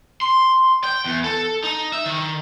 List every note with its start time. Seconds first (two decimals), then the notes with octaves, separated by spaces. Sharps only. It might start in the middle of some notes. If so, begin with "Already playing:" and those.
0.22 C6
0.84 G5
1.05 E2
1.24 A4
1.64 D#4
1.93 E5
2.06 D#3